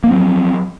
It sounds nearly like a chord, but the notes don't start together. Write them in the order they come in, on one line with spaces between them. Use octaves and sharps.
A#3 F3 C4 F#3